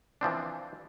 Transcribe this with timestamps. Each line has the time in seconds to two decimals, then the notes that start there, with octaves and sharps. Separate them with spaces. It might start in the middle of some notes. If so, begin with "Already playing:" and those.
0.21 E3 F3 C4 D4